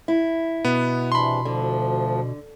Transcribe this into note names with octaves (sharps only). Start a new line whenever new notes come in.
E4
B2 B3
C3 E3 D4 B5 C6
D2 D3 F3